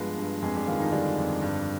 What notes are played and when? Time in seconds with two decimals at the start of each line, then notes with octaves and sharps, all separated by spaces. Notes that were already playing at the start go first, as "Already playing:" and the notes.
Already playing: G2 F3 G#3 B3 B4
0.18 G2
0.42 F2 G#3 G#4
0.55 G3 G4
0.67 D#3 F3 F4
0.80 D#3 D#4
0.92 D3 G3 D4
1.17 F2
1.42 G2